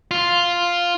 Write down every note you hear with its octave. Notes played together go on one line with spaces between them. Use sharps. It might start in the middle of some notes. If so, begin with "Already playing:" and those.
F4